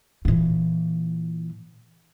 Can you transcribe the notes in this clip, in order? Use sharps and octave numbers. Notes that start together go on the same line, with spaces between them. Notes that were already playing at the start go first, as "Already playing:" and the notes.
A#2 E3